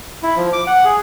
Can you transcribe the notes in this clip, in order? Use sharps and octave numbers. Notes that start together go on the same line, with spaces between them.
E4
F3
D6
F#5
G#4